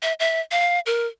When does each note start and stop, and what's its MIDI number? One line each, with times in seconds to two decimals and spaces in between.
0.03 0.13 76
0.20 0.41 76
0.51 0.80 77
0.86 1.06 70